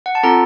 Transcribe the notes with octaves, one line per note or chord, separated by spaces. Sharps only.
F#5
A5
C4 F4 A4 A#5